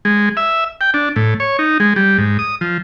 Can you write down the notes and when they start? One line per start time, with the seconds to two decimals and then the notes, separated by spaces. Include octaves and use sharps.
0.05 G#3
0.37 E5
0.81 G5
0.94 D4
1.16 A2
1.40 C#5
1.59 D#4
1.80 G#3
1.96 G3
2.18 G#2
2.39 D#6
2.61 F3